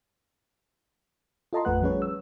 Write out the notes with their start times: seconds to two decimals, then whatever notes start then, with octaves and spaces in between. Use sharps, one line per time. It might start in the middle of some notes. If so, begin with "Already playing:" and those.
1.53 F4 A4 D#5 A5 A#5 C6
1.65 A1 F2 A3 B4 F#5 F#6
1.82 F3 G3 C#4 G#4 B4 C#5
2.02 E6